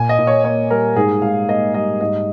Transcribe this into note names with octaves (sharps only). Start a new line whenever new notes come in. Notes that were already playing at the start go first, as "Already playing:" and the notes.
Already playing: A#2 G#5
D#5
A#2
C#5
A#3 C#5
G3 A#4
G#2 G#4
G#2 F5
A#3 D#5
G3 D#5
G#2 D#5